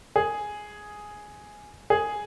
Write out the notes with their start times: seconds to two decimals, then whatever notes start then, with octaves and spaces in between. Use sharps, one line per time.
0.16 G#4
1.90 G#4